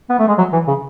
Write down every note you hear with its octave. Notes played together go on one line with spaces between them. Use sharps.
B3
A3
G#3
F#3
E3
C#3